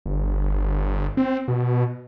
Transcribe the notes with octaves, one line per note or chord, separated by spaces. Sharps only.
G1
C4
B2